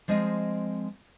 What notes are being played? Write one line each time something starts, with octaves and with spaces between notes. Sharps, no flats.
F3 G#3 C4 D#5